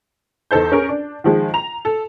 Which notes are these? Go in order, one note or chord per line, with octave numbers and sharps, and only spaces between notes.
E2 D#4 A4 C5 G6
C#4 G#4 A#4
D4
D#3 F3 G#3
A#5 F7
A4